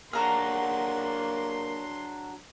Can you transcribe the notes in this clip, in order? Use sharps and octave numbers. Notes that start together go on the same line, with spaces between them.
F#3 A#3 D4 F#4 G#4 A#5 C6 F6